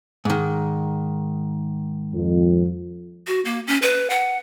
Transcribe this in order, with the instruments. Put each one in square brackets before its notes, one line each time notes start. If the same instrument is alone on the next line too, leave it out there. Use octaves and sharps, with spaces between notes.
[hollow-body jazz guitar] G#2 D#3
[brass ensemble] F2
[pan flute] F#4
A#3
C#4
B4
F#5